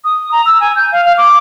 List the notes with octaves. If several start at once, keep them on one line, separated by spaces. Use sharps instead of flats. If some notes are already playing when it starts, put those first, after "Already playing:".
D#6
A#5
E6
G#5
G6
F5
F5
D6